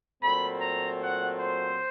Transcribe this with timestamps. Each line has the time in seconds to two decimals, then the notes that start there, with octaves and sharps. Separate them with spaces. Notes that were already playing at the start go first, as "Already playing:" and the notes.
0.22 A#2 F#3 A3 C4 B5
0.61 A#5
1.01 F#5
1.39 C5